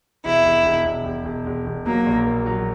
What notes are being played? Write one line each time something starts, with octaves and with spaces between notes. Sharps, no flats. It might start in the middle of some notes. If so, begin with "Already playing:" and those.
E1 E4
E1
E1
E1
E1
E1
E1
E1
F#3 A#3
A#1
A#3
F#3